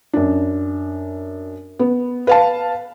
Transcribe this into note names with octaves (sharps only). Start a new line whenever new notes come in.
F#2 D4
B3
B4 F5 A5